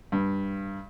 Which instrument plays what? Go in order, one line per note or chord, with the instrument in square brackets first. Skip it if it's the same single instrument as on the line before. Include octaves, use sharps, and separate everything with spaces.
[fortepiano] G2